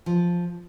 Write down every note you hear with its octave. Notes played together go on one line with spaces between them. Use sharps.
F3